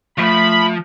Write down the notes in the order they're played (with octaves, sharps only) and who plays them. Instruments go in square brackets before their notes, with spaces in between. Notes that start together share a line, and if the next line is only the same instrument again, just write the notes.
[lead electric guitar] F3 [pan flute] A3 [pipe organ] B5